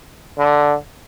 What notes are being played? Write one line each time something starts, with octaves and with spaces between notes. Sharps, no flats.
D3